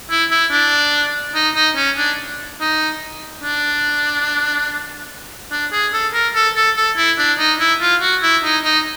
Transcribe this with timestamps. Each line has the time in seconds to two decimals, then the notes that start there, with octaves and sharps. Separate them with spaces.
0.10 E4
0.31 E4
0.51 D4
1.35 D#4
1.56 D#4
1.76 C#4
1.98 D4
2.60 D#4
3.43 D4
5.51 D4
5.72 G#4
5.93 A4
6.14 A#4
6.35 A4
6.56 A4
6.77 A4
6.97 E4
7.18 D4
7.38 D#4
7.59 E4
7.81 F4
8.01 F#4
8.23 E4
8.44 D#4
8.64 D#4